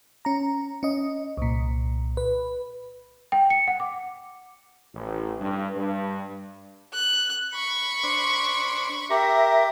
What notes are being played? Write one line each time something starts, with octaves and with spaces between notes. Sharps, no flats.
C#4 A#5
C#4 D#5
C2 A#2
B4
G5
C#7
F#5
D6
A1
G2
G2
F#6
B5 C#6
D4 C5
G4 A#4 E5